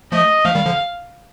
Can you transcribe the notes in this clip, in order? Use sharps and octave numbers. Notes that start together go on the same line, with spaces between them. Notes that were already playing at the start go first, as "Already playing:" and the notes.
F3 A3 D#5
F3 A3 F5
D#3 G3
D3 F3